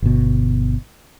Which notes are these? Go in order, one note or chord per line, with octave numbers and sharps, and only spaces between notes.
G1 B2